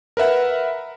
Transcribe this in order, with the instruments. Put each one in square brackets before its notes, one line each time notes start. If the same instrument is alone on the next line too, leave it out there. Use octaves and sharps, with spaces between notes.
[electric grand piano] A#4 B4 E5 F#5